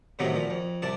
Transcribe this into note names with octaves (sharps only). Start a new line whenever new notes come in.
A2 C3 D#3 F#3 A#3 B3
A#2 F3
F2
C2 C3 D5 A5